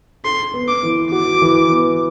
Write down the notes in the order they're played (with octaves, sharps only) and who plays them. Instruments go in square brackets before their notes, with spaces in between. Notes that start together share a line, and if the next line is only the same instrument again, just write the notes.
[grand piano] A4 [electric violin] C6
[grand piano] B3
[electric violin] D6
[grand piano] E3
[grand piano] F#4 [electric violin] D6
[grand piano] E3
B3